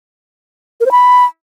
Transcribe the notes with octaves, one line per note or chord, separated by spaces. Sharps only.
A#4
C5
B5